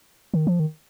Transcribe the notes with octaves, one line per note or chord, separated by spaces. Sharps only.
D#3
F3
D#3